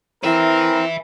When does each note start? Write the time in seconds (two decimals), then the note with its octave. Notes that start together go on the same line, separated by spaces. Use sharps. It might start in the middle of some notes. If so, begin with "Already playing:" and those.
0.24 C4 E4 A#4 B4 E5